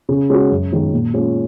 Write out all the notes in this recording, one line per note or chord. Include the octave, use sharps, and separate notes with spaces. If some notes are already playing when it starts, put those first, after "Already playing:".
C#3
G#3 C#4 F#4
F#2
D#3 G#3 C#4
A#2
G#3 C#4 F4